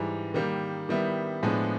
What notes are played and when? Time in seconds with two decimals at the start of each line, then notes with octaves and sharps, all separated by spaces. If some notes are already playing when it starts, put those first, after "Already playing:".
Already playing: G#2 E3 G3
0.34 D#3 G3 A#3
0.89 D#3 G3 B3 E4
1.43 A2 F3 G#3 B3 D4